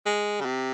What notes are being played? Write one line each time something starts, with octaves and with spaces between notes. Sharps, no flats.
G#3
C#3
C3